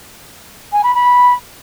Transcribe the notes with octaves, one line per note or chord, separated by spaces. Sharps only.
G#5
B5
B5